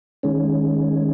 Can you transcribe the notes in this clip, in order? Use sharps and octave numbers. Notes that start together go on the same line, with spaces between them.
D#3 G#3 C#4